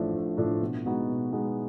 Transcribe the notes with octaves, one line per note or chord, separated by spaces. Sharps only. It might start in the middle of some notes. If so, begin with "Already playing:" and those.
Already playing: A1 A2 F3 A3 D4
A1
A2 F3 A3 D4
B2
G#3 B3 D#4 F#4
B2
G#3 B3 D#4 F#4